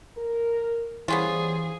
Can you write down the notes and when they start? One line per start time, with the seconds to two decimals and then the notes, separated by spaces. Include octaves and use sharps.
0.17 A#4
1.08 E3 G3 B3 C#4 F4 G#4 C5